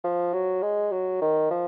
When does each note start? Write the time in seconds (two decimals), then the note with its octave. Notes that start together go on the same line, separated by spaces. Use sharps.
0.04 F3
0.33 F#3
0.63 G#3
0.92 F#3
1.22 D#3
1.51 F3